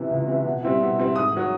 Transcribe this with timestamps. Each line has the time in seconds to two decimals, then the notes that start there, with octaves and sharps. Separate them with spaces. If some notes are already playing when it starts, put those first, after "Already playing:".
Already playing: C3 E3
0.11 C#2
0.28 C3 E3
0.45 B2
0.63 G3 C4 E4
0.81 B2
0.99 G3 C4 E4
1.15 G#2 D#6
1.33 D#3 F#3